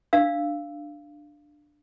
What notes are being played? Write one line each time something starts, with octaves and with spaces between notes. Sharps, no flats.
D4 F5 E6